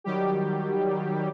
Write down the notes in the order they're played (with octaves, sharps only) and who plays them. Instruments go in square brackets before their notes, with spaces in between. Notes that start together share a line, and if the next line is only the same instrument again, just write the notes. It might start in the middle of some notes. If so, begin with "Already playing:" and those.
[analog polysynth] D#3 F#3 G3 G4